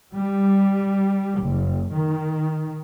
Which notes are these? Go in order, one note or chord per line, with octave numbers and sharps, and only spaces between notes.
G3
F#1
D#3